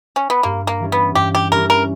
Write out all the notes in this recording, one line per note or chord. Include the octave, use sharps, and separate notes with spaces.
C#4
B3
G2 A#3
A#3
E3 G3 C#4
B3
G2 G4
G4
E3 G3 C#4 A#4
A#4